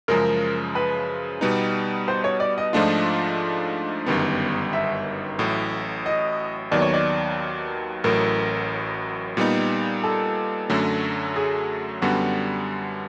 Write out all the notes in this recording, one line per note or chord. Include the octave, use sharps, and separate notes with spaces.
F#2 C#3 F3 G#3 A#4
B4
B2 G3 B3 D#4
C5
C#5
D5
D#5
G#2 F3 A3 D4 F4 D#5
G1 F#2 D#3 G3 B3
E5
A1 A2 F#3
D#5
D#2 D#3 F#3 B3 D5
C#5
D5
A1 A2 F#3 A#4
A#2 G3 B3 D#4
A4
F#2 D3 F#3 A3
G#4
F#2 D3 G3 B3 F#4